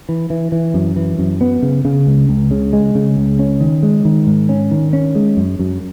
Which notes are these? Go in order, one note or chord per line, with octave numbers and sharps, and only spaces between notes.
E3
E3
E3
F#2
E3
F#2
B3
C#3
C#3
C#2
C#2
C#3
G#3
C#3
C#2
C#4
D#3
G#3
D#3
G#2
C#4
D#3
C#4
G#3
F#2
F#2